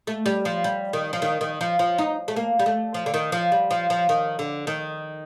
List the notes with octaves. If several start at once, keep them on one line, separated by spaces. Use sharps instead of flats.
A3
G3
F3
G3
D#3
F3
D#3
D#3
F3
F3
D#4
A3
A#3
G3
A3
F3
D3
D#3
F3
G3
F3
F3
D#3
D3
D#3